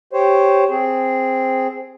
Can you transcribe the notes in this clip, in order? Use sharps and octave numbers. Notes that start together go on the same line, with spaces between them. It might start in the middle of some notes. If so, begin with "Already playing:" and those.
G4 C5 C#5
C4 G#4